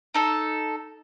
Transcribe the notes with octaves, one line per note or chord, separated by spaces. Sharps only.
D#4 A4